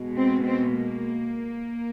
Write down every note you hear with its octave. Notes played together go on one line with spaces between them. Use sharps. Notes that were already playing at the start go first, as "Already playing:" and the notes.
Already playing: B2 G#3
C4
C4
A#3